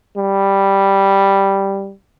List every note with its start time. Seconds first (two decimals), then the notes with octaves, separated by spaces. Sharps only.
0.16 G3